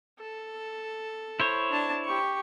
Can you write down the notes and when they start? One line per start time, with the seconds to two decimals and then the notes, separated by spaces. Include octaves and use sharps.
0.19 A4
1.40 E4 C5 C#5
1.70 D4 A5
2.05 G4 C#6